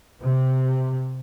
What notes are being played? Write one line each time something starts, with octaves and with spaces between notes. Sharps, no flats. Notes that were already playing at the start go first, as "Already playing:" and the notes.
C3